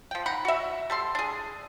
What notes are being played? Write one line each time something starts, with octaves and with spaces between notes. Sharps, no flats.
F3 G5
D#4 F#5 B5
F#4 E5
G3 A4 C6
D4 G#4